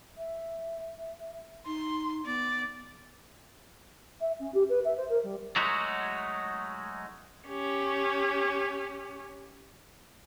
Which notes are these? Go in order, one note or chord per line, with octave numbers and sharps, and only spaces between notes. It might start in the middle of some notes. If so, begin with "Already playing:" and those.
E5
D#4 C6
B3 D5
E5
C#4
G4
B4
E5
C5
A#4
G3
F#3 G#3 A3 D#4 F#4
C#4 G4